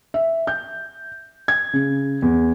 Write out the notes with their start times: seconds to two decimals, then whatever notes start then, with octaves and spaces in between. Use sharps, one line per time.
0.14 E5
0.47 G6
1.48 G#6
1.73 C#3
2.22 E2